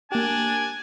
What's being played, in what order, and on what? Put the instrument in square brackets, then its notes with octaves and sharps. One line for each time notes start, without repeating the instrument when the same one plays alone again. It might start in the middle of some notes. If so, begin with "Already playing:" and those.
[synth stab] A#3 G4 [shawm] D4 [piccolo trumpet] G#5